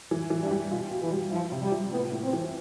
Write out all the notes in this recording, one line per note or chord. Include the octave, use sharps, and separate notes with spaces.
E3
E3
G2
G3
B2 F4
B2
E3
G3
F3 E4
C3
G3
F3
A2 B3
A2
C4
E3